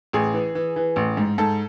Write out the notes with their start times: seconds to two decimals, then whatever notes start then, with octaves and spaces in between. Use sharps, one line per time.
0.13 A1 G#4
0.34 E3
0.55 E3
0.76 E3
0.96 A1
1.17 G#2
1.38 G#2 A4